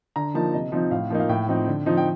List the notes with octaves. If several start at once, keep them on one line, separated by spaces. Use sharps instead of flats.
D3 A#5
F3 A#3 D#4 A5
C3 D#5
F3 C4 D#4
A2 F5
F3 A#3 D#4
F5
A2 G5
F3 C4 D#4
D3
F3 C4 D#4
G5